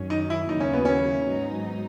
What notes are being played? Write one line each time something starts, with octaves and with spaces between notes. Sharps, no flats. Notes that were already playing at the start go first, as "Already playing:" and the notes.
Already playing: F#2 D#3 F#3 C#4
D#4
E4
D#2 C#3 F#3 A#3 D#4 E4
C#4
B3
C#4
G#2 F#3 B3 D#4